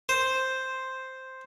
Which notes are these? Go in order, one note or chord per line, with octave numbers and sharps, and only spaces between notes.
C5